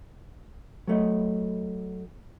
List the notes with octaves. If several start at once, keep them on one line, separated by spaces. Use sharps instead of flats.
F#3 A3 D#5